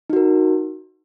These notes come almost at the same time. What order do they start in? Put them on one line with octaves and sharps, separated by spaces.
D#4 F#4 A#4